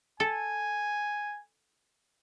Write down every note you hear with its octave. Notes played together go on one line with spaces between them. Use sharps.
A4 G#5